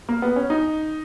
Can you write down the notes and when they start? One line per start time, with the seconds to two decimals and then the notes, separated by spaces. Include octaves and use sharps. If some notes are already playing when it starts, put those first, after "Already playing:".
0.09 A#3
0.22 B3
0.36 C#4
0.50 D#4